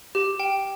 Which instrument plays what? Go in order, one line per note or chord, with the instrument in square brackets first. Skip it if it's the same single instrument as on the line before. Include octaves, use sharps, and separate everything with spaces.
[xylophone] G4
G5